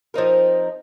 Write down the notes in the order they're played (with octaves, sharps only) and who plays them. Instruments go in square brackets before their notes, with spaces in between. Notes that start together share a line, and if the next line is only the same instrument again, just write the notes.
[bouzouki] F3 C4 D#4 A#4